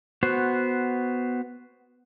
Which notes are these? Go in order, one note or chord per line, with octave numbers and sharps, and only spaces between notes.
B3 F#4 C5